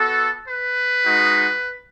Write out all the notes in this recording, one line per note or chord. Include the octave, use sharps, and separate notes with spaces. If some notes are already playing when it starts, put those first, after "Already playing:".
Already playing: B3 F#4 A4
B4
G#3 D#4 F#4